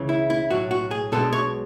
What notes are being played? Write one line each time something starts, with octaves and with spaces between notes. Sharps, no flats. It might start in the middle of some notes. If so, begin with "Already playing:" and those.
Already playing: C#2 C#3 E3
E4
E4
B1 A2 F#3 F#4
F#4
G#4
B1 B2 G#3 B3 D4 A4
C#5